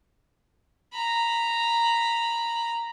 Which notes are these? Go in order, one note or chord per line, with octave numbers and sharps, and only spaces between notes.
A#5 B5